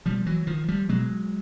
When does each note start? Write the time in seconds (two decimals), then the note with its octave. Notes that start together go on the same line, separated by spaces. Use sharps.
0.06 B2 F3 G3
0.26 E3 F#3
0.47 D#3 F3
0.68 F3 G3
0.89 B2 F#3 G#3